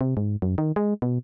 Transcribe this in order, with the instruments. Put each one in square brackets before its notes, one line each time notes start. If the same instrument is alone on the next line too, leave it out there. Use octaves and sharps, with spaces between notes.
[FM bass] C3
G#2
F#2
D#3
G#3
B2